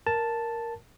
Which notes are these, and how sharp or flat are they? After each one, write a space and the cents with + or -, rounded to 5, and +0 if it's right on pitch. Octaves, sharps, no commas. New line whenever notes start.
A#4 +0 A5 +0